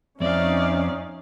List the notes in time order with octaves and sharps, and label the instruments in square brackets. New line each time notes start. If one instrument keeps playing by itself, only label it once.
[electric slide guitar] F2 C4 [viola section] C#4 D#4 [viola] D5 F5 [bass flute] E5